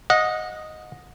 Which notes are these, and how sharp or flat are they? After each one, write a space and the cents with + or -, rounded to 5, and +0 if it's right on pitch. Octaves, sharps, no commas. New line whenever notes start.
D#5 +0 F#5 -30